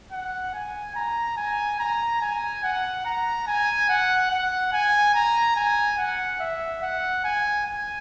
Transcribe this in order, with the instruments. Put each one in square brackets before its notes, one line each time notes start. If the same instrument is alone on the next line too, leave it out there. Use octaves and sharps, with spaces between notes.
[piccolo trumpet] F#5
G#5
A#5
G#5
A#5
G#5
F#5
A#5
G#5
F#5
F#5
G#5
A#5
G#5
F#5
E5
F#5
G#5
G#5